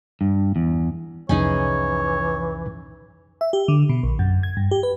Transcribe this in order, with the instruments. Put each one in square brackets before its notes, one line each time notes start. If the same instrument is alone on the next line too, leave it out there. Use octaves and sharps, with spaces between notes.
[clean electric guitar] G2
E2
[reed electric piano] C2 F2 [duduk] E3 [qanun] C#4 D#4 G#4 [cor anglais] C#5
[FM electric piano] E5
G4
D3
B2
A#1
F#2
G#6
G2
G4
B4